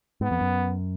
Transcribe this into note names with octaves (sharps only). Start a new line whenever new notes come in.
G#2 B3
F2
F#2